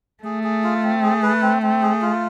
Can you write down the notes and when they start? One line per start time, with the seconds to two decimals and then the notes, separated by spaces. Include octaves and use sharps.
0.24 A3 G#4
0.43 G#4
0.64 F4
0.83 C4
1.03 G#4
1.23 B4
1.42 C4
1.62 C4
1.82 G#4
2.02 F4